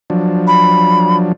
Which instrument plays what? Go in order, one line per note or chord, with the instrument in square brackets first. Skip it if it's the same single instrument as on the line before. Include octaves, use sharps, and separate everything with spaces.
[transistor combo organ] F3 F#3 D4
[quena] B5